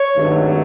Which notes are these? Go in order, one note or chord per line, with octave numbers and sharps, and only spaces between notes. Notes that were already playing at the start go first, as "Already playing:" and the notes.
Already playing: C#5
G#1 G2 D#3 F#3 A3